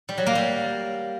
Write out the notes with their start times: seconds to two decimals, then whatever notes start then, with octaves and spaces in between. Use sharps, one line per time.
0.09 G3
0.18 F#3
0.26 A#3
0.35 G3